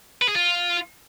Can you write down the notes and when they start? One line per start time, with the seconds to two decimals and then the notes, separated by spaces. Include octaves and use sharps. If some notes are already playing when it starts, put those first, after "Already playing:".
0.22 B4
0.28 G#4
0.35 F4